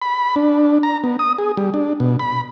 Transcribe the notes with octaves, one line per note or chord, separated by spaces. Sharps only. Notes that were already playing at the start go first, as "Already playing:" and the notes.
B5
D4
A#5
B3
D#6
G#4
G3
D4
B2
B5